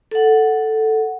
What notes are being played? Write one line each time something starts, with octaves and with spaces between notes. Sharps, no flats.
A4 F#5